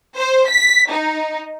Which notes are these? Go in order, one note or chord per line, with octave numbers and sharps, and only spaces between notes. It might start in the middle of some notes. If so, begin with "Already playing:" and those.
C5
B6
D#4